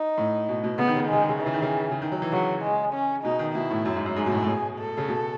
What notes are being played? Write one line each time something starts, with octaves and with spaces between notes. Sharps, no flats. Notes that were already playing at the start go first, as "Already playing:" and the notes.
Already playing: D#4
A2
B2
B2
C#3 B3
D#3
C#3
D#3
C#3 G#3
D#3
C#3
D#3 E3
C#3
D#3
C#3
C#3
D#3
F#3
E3
C#3 F#3
G#3
C#4
B2 D#4
D#3
B2 E4
A2
F#2
G#2
F#2
G#2 G#4
B2
A2
A2
B2 G#4
A4
C#3
B2